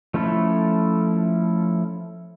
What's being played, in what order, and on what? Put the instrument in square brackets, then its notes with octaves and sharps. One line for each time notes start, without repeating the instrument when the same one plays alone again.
[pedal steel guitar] F3 A3 C#4 E4 A4